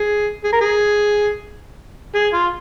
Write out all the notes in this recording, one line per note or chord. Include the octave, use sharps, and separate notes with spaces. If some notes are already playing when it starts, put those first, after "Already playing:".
Already playing: G#4
G#4
A#4
G#4
G#4
F4